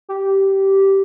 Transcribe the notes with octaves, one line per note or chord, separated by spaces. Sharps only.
G4